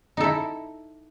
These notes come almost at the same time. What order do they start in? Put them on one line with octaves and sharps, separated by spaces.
D#4 A4 E4